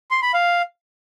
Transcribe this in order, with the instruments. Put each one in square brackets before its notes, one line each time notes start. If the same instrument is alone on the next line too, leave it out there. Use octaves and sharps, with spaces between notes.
[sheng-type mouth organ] C6
B5
F5